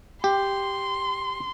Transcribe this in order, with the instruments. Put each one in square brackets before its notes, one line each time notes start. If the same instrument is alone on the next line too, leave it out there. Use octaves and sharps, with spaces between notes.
[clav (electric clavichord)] G4 [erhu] C6